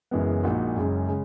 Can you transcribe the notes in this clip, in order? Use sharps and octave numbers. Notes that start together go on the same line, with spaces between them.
F#1 F#2 E3 G#3 B3
A#1 A#2 G#3 D#4 F#4
F#1 F#2 C#3 G#3
C#3 G#3